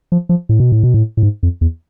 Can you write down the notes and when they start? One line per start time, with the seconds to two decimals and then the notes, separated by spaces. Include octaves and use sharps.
0.12 F3
0.29 F3
0.49 A2
0.60 B2
0.72 A2
0.83 B2
0.94 A2
1.17 A2
1.23 G#2
1.43 F2
1.61 E2